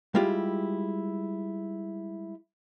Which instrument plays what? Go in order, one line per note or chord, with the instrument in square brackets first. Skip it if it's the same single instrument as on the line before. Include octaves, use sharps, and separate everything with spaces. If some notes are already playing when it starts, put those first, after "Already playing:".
[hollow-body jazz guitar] G3 G#3 E4 F4 G4